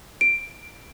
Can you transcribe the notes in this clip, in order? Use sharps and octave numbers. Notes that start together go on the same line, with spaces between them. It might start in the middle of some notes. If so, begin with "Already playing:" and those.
D7